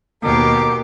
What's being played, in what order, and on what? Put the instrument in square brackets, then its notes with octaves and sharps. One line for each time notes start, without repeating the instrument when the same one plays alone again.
[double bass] D#2 [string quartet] B2 G4 [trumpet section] A4 D6 [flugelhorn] A#4